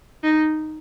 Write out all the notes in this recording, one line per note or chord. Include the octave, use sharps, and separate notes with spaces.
D#4